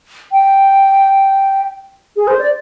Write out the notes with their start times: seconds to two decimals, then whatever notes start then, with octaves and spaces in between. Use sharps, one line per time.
0.32 G5
2.16 G#4
2.27 C5
2.39 D5